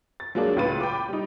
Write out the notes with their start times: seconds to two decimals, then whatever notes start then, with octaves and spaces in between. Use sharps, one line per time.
0.20 A6
0.35 F#3 G#3 A#3 D4
0.56 C#2 A2 F4 B4 A6 D#7
0.81 G5 B5 D6
1.09 G3 D#4